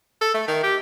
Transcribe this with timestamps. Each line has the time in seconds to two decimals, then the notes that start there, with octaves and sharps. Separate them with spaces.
0.21 A4
0.34 A3
0.48 D#3
0.63 G4